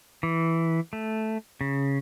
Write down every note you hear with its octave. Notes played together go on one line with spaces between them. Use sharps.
E3
A3
C#3